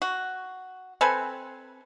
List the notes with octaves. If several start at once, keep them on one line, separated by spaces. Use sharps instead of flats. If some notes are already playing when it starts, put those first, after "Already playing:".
F#4
C4 A4 B4 G#5